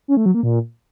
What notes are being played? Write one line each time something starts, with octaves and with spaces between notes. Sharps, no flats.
C#4
A3
F#3
A#3
A#2